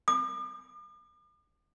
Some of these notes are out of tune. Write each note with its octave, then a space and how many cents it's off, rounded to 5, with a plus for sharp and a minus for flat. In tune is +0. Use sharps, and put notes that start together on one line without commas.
D6 +45